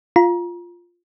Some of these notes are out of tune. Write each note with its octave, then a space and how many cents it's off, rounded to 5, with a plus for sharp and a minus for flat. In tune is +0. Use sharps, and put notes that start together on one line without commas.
F4 +0 A#5 +30